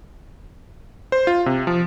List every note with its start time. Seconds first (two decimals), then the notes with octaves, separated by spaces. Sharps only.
1.12 C5
1.27 F4
1.46 C3
1.67 F3